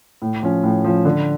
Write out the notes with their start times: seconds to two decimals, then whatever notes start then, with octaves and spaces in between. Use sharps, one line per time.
0.22 A2
0.42 F3 C#4
0.63 A2
0.84 F3 C#4
1.05 D3